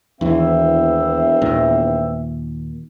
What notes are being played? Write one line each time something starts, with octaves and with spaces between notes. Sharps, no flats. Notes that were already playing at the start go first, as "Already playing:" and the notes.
E1 D#2 E3 B3 C4 E5
D#2 A#2 D#3